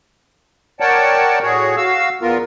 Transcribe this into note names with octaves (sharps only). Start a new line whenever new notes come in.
A#4 C#5 D5 F#5 G5 A5
A2 F#4 G#4 C#5
F#4 F5 E6
E2 B3 F4 A#4